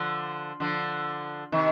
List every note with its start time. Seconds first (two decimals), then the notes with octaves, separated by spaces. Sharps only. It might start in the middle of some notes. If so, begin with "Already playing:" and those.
Already playing: D3 F3
0.60 D3 F3
1.52 C3 D#3